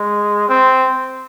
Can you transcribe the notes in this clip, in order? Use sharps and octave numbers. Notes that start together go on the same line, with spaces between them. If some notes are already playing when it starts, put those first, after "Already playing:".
Already playing: G#3
C4